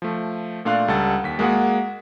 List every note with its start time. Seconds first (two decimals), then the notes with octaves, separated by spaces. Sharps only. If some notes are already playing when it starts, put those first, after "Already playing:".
0.02 F3 A3
0.65 A#2 A3 D4 F5 C6 F#6
0.88 C#2 G3 A4 F#5 A6
1.24 D#2 B6
1.39 G#3 A#3 F#4 G#4 F#5